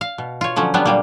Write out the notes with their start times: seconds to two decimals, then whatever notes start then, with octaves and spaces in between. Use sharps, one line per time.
0.01 F5
0.18 B2
0.41 F4 C#5
0.56 D3 F3 F#3 C#4
0.74 F#3 G3 B3 D4
0.85 A#2 G3 A#3